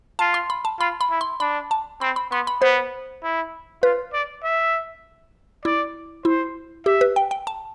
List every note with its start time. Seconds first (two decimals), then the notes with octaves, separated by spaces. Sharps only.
0.19 F4 A5
0.34 C6
0.50 B5
0.65 A5
0.80 F4 B5
1.01 B5
1.11 E4
1.21 C6
1.40 D4 B5
1.71 A5
2.01 C4 B5
2.16 B5
2.31 B3 C6
2.47 B5
2.62 B3 C5
3.23 E4
3.83 F4 B4
4.13 D5
4.44 E5
5.65 E4 D5
6.25 E4 C5
6.86 G4 E5
7.01 B4
7.16 G5
7.31 G5
7.47 A5